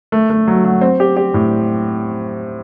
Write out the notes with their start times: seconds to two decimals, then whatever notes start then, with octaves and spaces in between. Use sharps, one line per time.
0.12 A3
0.30 A3
0.48 F#3
0.65 F#3
0.81 C4
1.00 G4
1.17 G4
1.34 A2